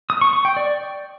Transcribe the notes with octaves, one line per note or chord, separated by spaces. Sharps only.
D#6
C#6
C#6
G5
D5